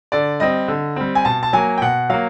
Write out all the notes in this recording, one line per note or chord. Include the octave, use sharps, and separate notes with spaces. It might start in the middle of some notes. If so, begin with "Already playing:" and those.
D3 D5
G3 C4 D#5
D3
G3 C4
G#5
B2 A5
A5
F#3 A#3 G#5
G5
B2 F#5
F#3 A#3 F5